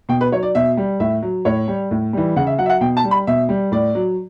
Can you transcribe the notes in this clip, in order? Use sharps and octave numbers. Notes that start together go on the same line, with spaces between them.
B2 G5
B4
F#3 C#5
D5
B2 E5
G3
A2 E5
F#3
A2 C#5
G3
A2
E3 G3
C#3 F#5
E5
F#3 F#5
E5
F#5
B2 G5
A5
G3
B5
B2 E5
G3
A2 D5
F#3